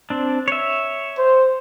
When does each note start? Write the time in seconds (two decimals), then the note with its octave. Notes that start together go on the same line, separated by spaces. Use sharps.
0.10 C4 D4
0.48 C#5 E5
1.18 C5